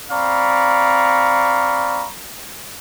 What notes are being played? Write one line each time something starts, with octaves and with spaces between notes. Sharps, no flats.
C4 D5 F5 A#5 B5 C#6